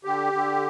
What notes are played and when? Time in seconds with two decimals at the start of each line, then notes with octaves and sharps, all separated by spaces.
0.04 D3 G4
0.33 D3